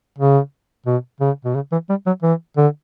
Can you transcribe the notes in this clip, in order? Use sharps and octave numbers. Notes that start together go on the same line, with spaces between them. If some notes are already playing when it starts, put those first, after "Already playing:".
C#3
B2
C#3
B2
C#3
E3
G3
F#3
E3
D3